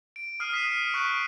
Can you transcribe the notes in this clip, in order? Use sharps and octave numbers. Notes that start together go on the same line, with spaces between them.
D7
D#6 F6 C7 D#7
D#6 B6 C7 D#7 E7
C#7
C#6 F#6 B6 D7